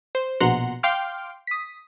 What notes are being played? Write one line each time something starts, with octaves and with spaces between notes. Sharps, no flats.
C5
A#1 B2 F#5 A#5 C6
F5 G5 C6 D6 F6
D#6 B6